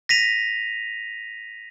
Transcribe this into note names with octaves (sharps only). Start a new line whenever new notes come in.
A#6 B6 D#7 F7